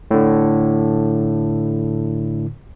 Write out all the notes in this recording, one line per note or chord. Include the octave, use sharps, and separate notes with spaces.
A2 D3